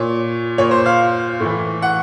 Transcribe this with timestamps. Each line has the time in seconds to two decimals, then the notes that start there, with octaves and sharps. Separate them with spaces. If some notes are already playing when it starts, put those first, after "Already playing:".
Already playing: A#2 C#5
0.58 A#2 C#5
0.71 C5
0.86 F5
1.40 A2 E3
1.82 F#5